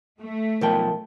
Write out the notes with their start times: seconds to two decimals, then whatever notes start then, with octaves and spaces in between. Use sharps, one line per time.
0.21 A3
0.61 B1 F3 A#4 G5 A5